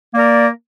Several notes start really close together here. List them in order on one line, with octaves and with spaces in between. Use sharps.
A#3 D5 A#4